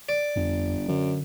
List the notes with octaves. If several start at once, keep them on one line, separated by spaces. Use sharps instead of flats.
D5
G1 F2
F#2 D3